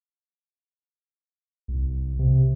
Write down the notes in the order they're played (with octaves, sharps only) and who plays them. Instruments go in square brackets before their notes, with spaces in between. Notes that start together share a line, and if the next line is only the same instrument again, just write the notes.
[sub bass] C2
C3